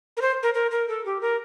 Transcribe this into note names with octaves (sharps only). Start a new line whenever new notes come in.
A#4
C5
A#4
A#4
A#4
A4
G4
A#4